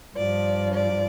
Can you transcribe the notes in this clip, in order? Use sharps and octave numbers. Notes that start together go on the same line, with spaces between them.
G2 F3 D5
D5